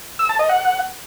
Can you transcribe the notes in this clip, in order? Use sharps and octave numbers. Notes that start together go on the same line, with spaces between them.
E6
A5
D#5
F#5